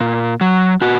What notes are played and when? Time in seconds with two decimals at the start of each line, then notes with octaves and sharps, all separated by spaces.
0.01 A#2
0.41 F#3
0.81 A#2 F#4